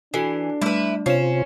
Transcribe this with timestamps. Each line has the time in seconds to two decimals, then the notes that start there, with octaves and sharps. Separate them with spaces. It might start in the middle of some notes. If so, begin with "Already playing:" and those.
0.14 E3 D4 F#4 A4 C7
0.62 G3 A3 E4 B4
1.06 C3 C#4 F4 C5 C7 E7